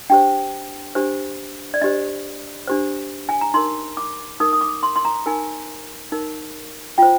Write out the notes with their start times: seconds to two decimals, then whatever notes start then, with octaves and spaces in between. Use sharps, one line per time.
0.10 D4 G4 C5 G5
0.95 D4 G4 C5
1.74 D5
1.82 D4 G4 C5 D#5
2.67 D4 G4 C5
3.29 G#5
3.41 A#5
3.54 D#4 A#4 C6
3.97 D6
4.40 D#4 A#4 D#6
4.53 D#6
4.61 D6
4.83 C6
4.96 C6
5.05 A#5
5.26 D#4 A#4 G#5
6.12 D#4 A#4
6.98 F4 C5 G5